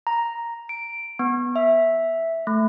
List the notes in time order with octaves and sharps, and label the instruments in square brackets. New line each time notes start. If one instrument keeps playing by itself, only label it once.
[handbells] A#5
D7
B3
E5
A3